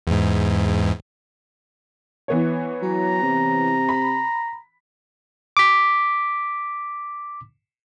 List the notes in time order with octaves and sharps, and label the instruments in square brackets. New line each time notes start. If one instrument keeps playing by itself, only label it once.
[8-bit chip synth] E2 G#2
[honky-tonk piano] E3 B3 C#5
[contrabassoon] F#3 [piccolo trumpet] A#5
[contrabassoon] C3
[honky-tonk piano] B5
[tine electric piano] D6 B6